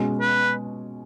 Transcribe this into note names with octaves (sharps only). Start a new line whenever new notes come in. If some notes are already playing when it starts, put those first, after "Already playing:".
Already playing: B2 G#3 C#4 F#4
B4